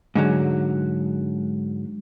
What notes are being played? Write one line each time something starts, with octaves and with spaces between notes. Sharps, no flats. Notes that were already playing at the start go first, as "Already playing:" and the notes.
G#2 D3 F#3